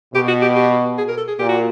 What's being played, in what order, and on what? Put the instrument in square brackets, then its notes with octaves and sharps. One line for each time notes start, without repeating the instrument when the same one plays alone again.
[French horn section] B2 [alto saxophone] G4
[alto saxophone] F#4
G4
G4
G#4
A#4
A4
G#4
[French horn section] A#2 [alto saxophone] G4
[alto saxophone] F#4